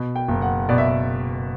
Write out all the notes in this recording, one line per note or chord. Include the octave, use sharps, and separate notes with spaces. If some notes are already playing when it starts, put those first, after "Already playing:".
Already playing: B2
G5
F#1
F#5
B2 D5
E5